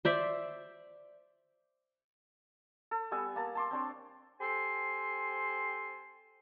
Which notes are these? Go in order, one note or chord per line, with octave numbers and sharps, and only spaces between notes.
C5 D5 E5
A4
G3 B3 G#5 E6
A#3 A5
A5 C6 D6
C4 D4 C#5
C4 G4 A4 G#5 C6